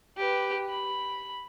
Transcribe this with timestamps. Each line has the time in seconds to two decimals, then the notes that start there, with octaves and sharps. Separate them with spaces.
0.17 G4 B4
0.69 B5